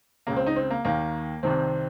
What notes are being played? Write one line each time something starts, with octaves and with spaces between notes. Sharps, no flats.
C#2 C#3 A#3
C4
D#4
C4
A#3
D#2 D#3 A#3
C2 C3 D#3 C4